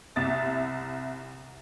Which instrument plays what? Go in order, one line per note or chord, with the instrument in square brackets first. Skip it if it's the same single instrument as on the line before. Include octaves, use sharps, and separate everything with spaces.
[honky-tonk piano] C2 E5 A6